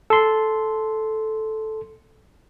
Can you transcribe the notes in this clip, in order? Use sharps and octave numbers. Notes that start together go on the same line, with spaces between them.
A4 C6